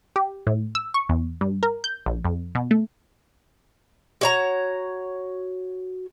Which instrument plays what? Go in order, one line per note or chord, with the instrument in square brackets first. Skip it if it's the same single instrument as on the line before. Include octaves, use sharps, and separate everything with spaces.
[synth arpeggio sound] G4
A2
E6
C#6
E2
G2
A#4
G6
A#1
F2
B2
A3
[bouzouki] F#4 C#5 A#5